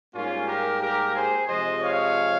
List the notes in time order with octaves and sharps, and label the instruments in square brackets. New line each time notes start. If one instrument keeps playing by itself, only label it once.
[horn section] G#2 G3 A#3 C#4 F4
G4 A#4
G4 A#4
G#4 C5
C3 F3 G#3 C5 D#5
C#5 F5